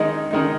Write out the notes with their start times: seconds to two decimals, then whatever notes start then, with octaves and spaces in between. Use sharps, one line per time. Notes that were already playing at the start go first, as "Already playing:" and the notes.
Already playing: D#3 G#3 D#4
0.31 D#3 G#3 D#4